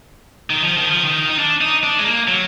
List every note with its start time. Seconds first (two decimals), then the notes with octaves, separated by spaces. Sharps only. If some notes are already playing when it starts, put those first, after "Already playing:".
0.50 D#3
0.64 F3
0.77 D#3
0.90 F3
1.05 D#3
1.30 D#4
1.39 D4
1.61 D#4
1.84 D4
1.98 G#3
2.05 A#3
2.28 F#3